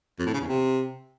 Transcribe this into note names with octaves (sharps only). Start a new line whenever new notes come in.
F2
A2
C#3
E2
C3